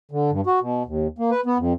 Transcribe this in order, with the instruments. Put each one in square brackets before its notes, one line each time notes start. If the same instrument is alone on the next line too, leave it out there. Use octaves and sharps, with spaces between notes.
[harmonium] D3
G2
F#4
B2
D#2
A#3
B4
B3
F2